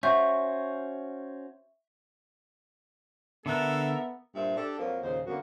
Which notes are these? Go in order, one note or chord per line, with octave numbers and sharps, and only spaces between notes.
C#4 F#4 C5 E5 C#6 G6
D3 B3 A4 A#4 E5 A5 F#6
G2 A#2 C5 E5
D4 G4 A4
F2 F3 F#3 A#3
D#2 A#2 C#3 C5
F#2 D3 A#3 B3 F#4